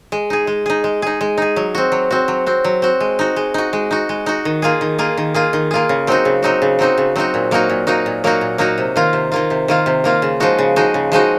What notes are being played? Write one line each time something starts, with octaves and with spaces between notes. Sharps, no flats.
G#3
D#4 G#4
G#3
D#4 G#4
G#3
D#4 G#4
G#3
D#4 G#4
F#3
C4 F#4
F#3
C4 F#4
F#3
C4 F#4
F#3
C4 F#4
G#3
D#4 F#4
G#3
D#4 F#4
G#3
D#4 F#4
G#3
D#4 F#4
D#3
A#3 F4 G#4
D#3
A#3 F4 G#4
D#3
A#3 F4 G#4
D#3
A#3 F4 G#4
C#3
F#3 C4 D#4 F#4
C#3
F#3 C4 D#4 F#4
C#3
F#3 C4 D#4 F#4
C#3
F#3 C4 D#4 F#4
A#2
F#3 A#3 D#4 F#4
A#2
F#3 A#3 D#4 F#4
A#2
F#3 A#3 D#4 F#4
A#2
F#3 A#3 D#4 F#4
C3
D#3 A#3 F4
C3
D#3 A#3 F4
C3
D#3 A#3 F4
C3
D#3 A#3 F4
C#3
F3 G#3 D#4 F#4
C#3
F3 G#3 D#4 F#4
C#3
F3 G#3 D#4 F#4